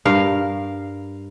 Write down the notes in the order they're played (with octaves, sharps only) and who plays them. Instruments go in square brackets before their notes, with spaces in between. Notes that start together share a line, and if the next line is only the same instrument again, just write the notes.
[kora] G2 A#4 F5